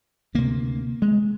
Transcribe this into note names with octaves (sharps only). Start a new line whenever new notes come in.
D2 C3 A#3
G#3